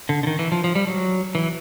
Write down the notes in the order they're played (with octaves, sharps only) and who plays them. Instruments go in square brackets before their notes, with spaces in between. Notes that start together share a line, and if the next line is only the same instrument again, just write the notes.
[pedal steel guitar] D3
D3
D#3
E3
F3
F3
G3
F#3
E3